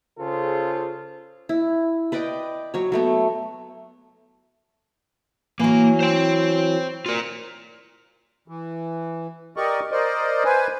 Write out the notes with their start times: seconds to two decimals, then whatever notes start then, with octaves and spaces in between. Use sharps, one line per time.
0.19 C#3 F4 G#4 A4 C5
1.49 E4
2.12 B4 D5 D#5 G5
2.74 F#3 C#5
2.92 F#3 A3 B3
5.60 E3 F#3 A#3
6.00 C5 G5
7.06 F4 A#4
8.48 E3
9.57 G4 A#4 D5 D#5 C#6
9.92 A#4 C5 D5 D#5
10.45 B4 C5 G#5